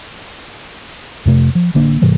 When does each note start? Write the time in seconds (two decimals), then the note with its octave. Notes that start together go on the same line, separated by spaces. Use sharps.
1.26 F2 C3 A3
1.55 F3
1.74 A1 D3 A#3 D4
2.02 G#2 C3 E3 G3